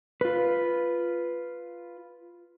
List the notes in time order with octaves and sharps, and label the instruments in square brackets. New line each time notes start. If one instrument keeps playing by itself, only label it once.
[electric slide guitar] F4 B4